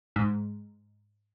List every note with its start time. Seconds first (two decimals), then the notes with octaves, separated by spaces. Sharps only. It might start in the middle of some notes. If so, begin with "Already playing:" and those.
0.16 G#2